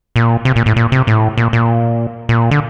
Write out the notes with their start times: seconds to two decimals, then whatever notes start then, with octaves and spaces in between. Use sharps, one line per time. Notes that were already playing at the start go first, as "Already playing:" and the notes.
0.16 A#2
0.45 C3
0.56 A#2
0.66 A2
0.76 A#2
0.92 C3
1.07 A2
1.38 A#2
1.53 A#2
2.29 A#2
2.51 D3